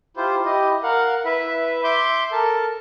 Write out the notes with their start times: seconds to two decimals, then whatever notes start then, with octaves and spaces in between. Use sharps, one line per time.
0.17 E4 F4 G4 C5
0.45 E4 G4 D#5
0.83 A#4 F5 F#5
1.25 E4 B4 E5
1.84 E5 C6 D6 G6
2.32 A4 A#4 A5